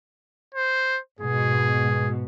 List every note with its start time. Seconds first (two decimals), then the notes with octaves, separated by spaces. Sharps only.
0.54 C5
1.21 G#2 B2 G#4